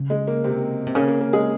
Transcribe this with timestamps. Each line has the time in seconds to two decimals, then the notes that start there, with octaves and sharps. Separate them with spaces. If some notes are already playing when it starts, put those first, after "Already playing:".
Already playing: C#3
0.10 G#3
0.28 A#3
0.44 C3 C4
0.86 C3
0.95 C#3 A#3
1.08 A#3
1.21 A#3
1.33 G#3 G#4